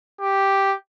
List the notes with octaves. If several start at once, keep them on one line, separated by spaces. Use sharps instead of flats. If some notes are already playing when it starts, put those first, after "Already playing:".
G4